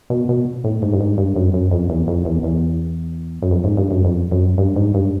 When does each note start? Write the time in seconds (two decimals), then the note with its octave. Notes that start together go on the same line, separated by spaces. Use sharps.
0.10 B2
0.29 B2
0.64 A2
0.82 G#2
0.93 G2
1.00 G#2
1.18 G2
1.36 F#2
1.54 F#2
1.71 F2
1.89 E2
2.08 F2
2.25 E2
2.43 E2
3.42 F#2
3.51 F2
3.64 G#2
3.77 G2
3.91 F#2
4.04 F2
4.31 F#2
4.58 G2
4.76 G#2
4.94 G2